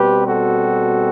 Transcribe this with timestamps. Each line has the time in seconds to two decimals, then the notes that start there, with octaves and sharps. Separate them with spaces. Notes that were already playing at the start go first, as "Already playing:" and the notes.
Already playing: B2 G3 C4 G4 B4
0.26 F#4 A4